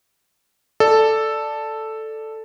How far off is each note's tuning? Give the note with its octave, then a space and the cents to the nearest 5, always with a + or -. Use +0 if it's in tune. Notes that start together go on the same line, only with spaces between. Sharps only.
A4 +0 D5 +10